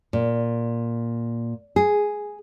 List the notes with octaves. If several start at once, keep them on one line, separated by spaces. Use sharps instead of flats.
A#2
G#4